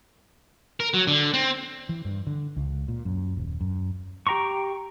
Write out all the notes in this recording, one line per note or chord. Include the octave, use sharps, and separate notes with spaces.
A#4
F#3
D3
C4
E3
G2
D3
C#2
A#2
F#2
D#1
F#2
G4 G5 A#5 C6 C#6